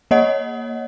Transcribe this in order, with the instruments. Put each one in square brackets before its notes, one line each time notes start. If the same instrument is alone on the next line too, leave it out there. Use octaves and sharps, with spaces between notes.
[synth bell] A#3 C#5 D#5 F#5